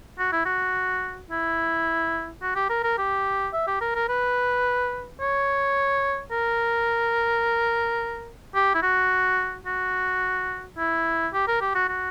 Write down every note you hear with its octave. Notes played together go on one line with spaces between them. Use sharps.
F#4
E4
F#4
E4
F#4
G4
A#4
A#4
G4
E5
G4
A#4
A#4
B4
C#5
A#4
G4
E4
F#4
F#4
E4
G4
A#4
G4
F#4
F#4